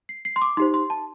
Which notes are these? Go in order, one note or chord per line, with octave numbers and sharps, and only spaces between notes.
C7
C7
C6
D6
D#4 G4 C5 C6
C6
A5